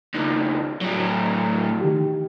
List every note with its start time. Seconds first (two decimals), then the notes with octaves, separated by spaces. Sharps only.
0.14 C#2 D#3
0.81 A2 F#3
1.81 D#3 G4